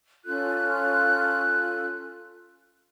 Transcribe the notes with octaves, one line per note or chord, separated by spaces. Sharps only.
C#4 F4 A4 F#6